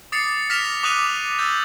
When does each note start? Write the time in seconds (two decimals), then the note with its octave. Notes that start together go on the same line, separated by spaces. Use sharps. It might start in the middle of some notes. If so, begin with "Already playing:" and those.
0.12 D6 D#6 A6 C7 C#7
0.50 F6 A#6 B6 C#7 E7 F7
0.83 D6 D#6 F#6 D#7 F7
1.39 E6 G6 A6